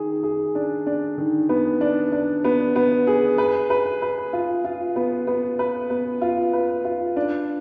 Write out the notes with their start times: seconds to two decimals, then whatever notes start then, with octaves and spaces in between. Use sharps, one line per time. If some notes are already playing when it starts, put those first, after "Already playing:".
Already playing: D#3 G#4
0.23 G#4
0.55 D4
0.86 D4
1.18 D#3
1.49 B3
1.81 D4
2.12 D4
2.44 B3
2.76 B3
3.07 G#4
3.38 B4
3.70 B4
4.02 B4
4.33 F4
4.65 F4
4.96 B3
5.27 B3
5.59 B4
5.90 B3
6.22 F4
6.53 B4
6.85 F4
7.16 D4